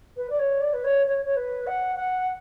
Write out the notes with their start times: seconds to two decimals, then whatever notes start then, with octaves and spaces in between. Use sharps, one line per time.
0.16 B4
0.29 D5
0.38 C#5
0.61 D5
0.73 B4
0.84 C#5
1.06 C#5
1.25 C#5
1.36 B4
1.66 F#5
1.96 F#5